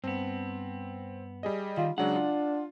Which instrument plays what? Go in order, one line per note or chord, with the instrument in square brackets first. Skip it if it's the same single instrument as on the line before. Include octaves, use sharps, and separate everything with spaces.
[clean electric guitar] G2 B3 [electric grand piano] C4
[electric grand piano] G3 G#4 D#5
[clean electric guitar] D#3 [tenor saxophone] F4
[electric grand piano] C#3 F#3 G#3 [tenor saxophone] D4 [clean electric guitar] F#5
[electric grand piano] F4